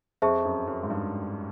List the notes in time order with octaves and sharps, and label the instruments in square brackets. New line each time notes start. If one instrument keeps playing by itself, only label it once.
[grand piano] F2 [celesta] G#4 C5 E5 A5 C#6
[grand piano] F#2
F#2
G#2
G2